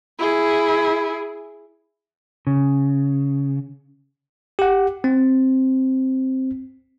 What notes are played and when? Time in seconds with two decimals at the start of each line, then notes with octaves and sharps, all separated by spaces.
0.19 E4 G#4
2.47 C#3
4.59 G4 F#5
5.04 C4